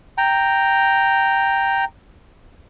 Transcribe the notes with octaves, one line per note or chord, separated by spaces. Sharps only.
G5 A#5